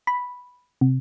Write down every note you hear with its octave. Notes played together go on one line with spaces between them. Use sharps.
B5
C3